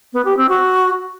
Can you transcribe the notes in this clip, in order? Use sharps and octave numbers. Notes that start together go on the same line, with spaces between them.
B3
G4
C4
F#4